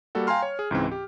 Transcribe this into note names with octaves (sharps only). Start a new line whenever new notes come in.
G3 A#3 F#4 A4 F#5
F5 G5 G#5 A#5 C6 F6
C#5
G#4
C#2 G#2 E3 C4
G4